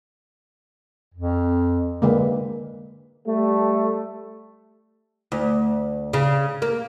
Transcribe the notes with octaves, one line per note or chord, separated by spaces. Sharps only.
F2
D3 G#3 A#3 B4
G3 A3
D2
C#3
A#3